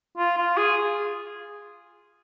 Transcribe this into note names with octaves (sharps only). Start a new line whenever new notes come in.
F4
F4
G#4